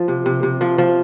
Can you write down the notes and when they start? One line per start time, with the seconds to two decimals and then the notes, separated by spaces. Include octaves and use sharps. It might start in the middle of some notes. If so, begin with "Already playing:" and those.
Already playing: F3
0.08 C3
0.26 C3
0.43 C3
0.61 F3
0.78 F3